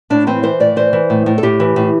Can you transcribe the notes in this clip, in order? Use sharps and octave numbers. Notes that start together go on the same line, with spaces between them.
A2 D4
E3 C4
E3 C5
A2 D5
E3 C5
E3
A2
A2
A4
A2 G4
E3
A2